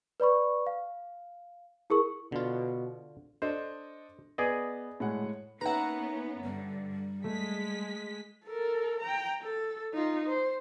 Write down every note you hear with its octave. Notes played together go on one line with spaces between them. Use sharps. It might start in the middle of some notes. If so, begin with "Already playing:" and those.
B4 D5 B5 C#6
F5
E4 G#4 A#4 C#6
B2 D3 F4
D4 A4 C5 D#5
B3 G#4 D5 D#5
A2 G#3 F#5
A#3 B3 C#4 D#4 B4 E5 F#5 A#5
G2 D3 G3
G#3 A3 B6
A4 A#4
G5 A#5
A4
D#4 F4
C5